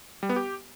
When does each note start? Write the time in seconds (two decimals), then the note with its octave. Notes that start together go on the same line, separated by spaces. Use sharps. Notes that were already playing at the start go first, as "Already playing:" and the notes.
0.23 G3
0.29 B3
0.36 G4